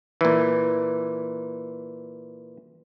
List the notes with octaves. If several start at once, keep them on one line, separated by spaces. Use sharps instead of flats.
A#2 E3